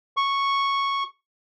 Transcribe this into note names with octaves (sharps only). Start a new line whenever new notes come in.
C#6